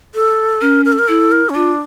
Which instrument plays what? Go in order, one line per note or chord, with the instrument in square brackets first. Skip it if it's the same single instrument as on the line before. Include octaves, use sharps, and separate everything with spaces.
[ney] A4
[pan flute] C#4 [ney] A#4
[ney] A#4
A4
A#4
[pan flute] E4 [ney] A4
[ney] A#4
C#4
[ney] D4 [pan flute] F4